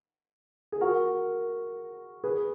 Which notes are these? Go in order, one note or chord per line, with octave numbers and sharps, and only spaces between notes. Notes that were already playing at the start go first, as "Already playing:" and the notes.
G#4
F#4 A#4
G#4 B4